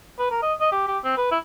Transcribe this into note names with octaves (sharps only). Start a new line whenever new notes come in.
B4
A#4
D#5
D#5
G4
G4
C4
B4
E4